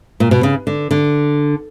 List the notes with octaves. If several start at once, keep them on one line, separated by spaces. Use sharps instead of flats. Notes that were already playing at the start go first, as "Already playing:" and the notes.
A#2
B2
C#3
D3
D3